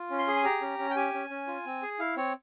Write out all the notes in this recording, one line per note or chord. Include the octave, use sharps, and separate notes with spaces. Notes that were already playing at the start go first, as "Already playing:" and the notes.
Already playing: F4
C#4
C6
G#4
G#5
G4 A#5
C#4
C#4
G5
G4 G#5
C#4
C#4
F4
C4
G#4
E4 F5
C4 C#5